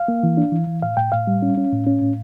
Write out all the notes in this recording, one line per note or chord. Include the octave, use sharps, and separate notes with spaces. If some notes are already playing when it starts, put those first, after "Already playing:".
Already playing: F5
A#3
E3
D4
E3
E3
A2 F5
A2 G5
A2 F5
G3
C#4
C#4
A2
C#4
A2